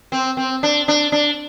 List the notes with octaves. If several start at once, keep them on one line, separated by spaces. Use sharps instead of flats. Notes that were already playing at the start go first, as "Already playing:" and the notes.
C4
C4
D4
D4
D4